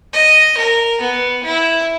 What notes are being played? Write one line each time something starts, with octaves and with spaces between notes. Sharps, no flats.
D#5
A#4
B3
E4